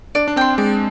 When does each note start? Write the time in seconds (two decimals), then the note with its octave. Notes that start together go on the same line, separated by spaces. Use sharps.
0.15 D4 D5
0.28 D4
0.36 C4 G5 C6
0.58 G#3 D5